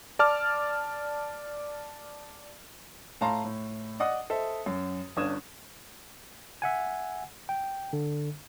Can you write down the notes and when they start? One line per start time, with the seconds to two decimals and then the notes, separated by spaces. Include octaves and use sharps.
0.19 D5 A5 D6 F6
3.21 A2 F5 A5 A#5 C6
3.45 A2
4.00 D5 D#5 F#5 D#6
4.30 A4 C5 D#5 E5
4.66 F#2
5.17 G1 C#4 D4 D#6 G#6 E7
6.62 E5 F#5 G#5
7.49 G5
7.93 D3